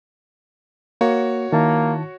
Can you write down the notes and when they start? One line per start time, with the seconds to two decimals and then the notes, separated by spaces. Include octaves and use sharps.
1.01 A#3 F#4 C#5
1.52 D#3 A#3 E4 A5